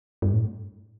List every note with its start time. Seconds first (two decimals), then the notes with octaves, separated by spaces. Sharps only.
0.22 G2
0.33 A2